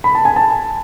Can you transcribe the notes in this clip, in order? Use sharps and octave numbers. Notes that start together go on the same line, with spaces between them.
B5
A5
G#5
A5